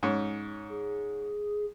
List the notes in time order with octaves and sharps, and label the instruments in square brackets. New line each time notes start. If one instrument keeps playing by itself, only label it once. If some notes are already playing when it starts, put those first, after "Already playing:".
[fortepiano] G#2 C#4
[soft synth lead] G#4